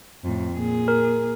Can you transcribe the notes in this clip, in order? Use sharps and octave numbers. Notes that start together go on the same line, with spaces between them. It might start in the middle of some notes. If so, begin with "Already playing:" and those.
F2 A2
A#2 G#4
A#4